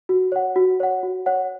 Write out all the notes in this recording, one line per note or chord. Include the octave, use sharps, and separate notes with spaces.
F#4
C#5 F#5
F#4
C#5 F#5
F#4
C#5 F#5